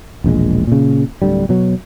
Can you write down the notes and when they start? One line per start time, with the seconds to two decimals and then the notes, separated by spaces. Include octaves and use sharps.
0.24 E1 A#1 B2 G#3
0.67 A#2 C#3
1.22 D1 D3 G3
1.49 B2 F#3